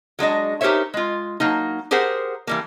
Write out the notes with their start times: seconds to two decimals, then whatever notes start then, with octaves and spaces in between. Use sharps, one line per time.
0.19 F#3 G#3 D4 D#5
0.61 D#4 G4 A#4 C5 C#5 E5
0.94 G#3 F4
1.40 F#3 A#3 D#4
1.91 G4 G#4 A#4 C5 F#5
2.47 E3 G3 A#3